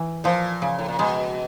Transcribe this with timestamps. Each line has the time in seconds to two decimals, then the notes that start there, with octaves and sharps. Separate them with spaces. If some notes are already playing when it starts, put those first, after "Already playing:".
Already playing: E3
0.24 A#2 F3
0.62 C#3
0.78 A2
0.88 A#2
0.99 B2 G#3